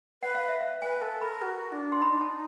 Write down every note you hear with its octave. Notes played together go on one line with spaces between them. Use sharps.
B4 F#5
F5
E5
F5
B4 G#5
A4 A5
A#4 B5
F#4
D4
C6
D#4 B5
D4
D#4 A5